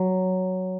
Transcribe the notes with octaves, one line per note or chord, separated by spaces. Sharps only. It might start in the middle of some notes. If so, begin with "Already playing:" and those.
Already playing: F#3